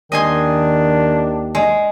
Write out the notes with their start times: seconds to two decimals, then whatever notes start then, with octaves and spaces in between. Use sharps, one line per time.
0.12 D#2 D#3 D4 D#5 G#5 C6
1.55 G#3